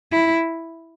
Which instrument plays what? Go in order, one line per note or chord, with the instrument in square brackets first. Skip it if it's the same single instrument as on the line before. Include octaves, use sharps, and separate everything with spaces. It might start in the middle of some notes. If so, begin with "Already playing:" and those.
[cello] E4